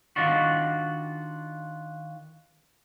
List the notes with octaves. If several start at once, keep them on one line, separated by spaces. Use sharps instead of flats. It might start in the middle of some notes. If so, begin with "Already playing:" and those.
D#3 D4 F4 F#4